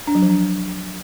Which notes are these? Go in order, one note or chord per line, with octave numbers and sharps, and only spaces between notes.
D4
F#3
F3
D4